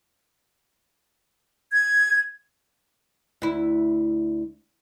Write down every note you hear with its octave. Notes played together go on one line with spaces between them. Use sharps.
G#6
D2 E4